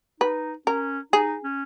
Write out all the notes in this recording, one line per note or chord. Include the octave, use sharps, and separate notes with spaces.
D#4 B4
C#4 A#4
D#4 G#4
C#4